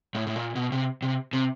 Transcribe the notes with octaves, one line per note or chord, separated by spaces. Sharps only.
A2
A2
A#2
B2
C3
C3
C3